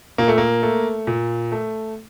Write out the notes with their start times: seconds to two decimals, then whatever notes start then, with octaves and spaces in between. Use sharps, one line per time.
0.18 A#2 A#3
0.28 A3
0.38 A#3
0.63 A3
1.07 A#2
1.52 A3